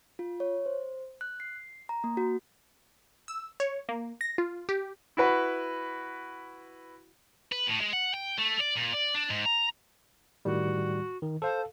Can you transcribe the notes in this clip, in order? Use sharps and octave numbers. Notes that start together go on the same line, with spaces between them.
F4
C#5
C5
F#6
C7
A#5
A#3
F#4
E6
C#5
A#3
A#6
F4
G4
E4 F#4 B4
B4
A2
G#3
F#5
G5
A3
D5
A#2
D5
D4
G#2
A#5
A2 D#3 G3 F#4
D#3
A4 C5 F5